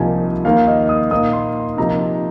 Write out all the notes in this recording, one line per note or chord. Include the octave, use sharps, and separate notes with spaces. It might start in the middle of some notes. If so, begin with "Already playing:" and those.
Already playing: C2 C3 F3 A#3 D#4 G#5
D#2 D#3 A#3 F5
D#5
D#6
A#2 A#3 D#4 D#6
C6
C3 F3 A#3 D#4 A#5